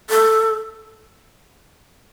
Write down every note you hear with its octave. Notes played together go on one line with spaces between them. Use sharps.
A4